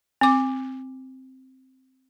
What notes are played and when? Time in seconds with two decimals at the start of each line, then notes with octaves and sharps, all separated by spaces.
0.21 C4 D6